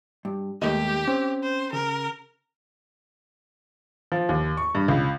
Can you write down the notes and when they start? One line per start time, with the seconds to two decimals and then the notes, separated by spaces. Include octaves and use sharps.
0.25 G2
0.62 D#2 G#3 A3 G4 D#5
1.08 C4 C#4
1.43 C5
1.73 C#3 A#4
4.12 F3
4.29 D#2
4.57 C#6
4.75 G2
4.88 C#2